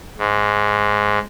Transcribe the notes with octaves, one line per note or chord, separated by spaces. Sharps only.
G#2